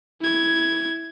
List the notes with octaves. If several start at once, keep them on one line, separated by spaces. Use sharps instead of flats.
E4 G#6